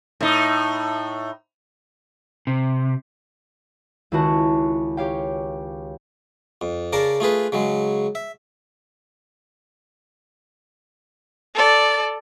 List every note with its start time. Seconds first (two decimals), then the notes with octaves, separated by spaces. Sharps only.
0.21 A2 D#4
2.47 C3
4.12 C#2 D#3 E4 F#4 A5
4.97 G4 C#5 F5 G5
6.61 F2
6.93 C#3 A#4 D5 A5 A#5
7.20 A3 F4 G#4 B4
7.52 C#3 F#3 G#3
8.15 E5
11.54 A4 D5